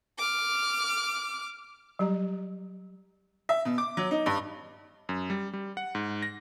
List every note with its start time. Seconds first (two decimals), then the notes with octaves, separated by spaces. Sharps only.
0.18 D6 F6
1.99 F#3 G3 G4 A#5
3.49 E5
3.65 B2
3.78 D6
3.97 F#3
4.11 D#4
4.26 G2
5.09 F#2
5.30 G3
5.53 G3
5.77 F#5
5.95 G#2
6.23 A#6